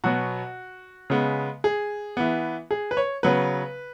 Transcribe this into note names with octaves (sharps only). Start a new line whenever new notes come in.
B2 F#3 B3 F#4
C#3 G#3 B3
G#4
E3 B3
G#4
B4
C#5
C#3 F#3 B3 B4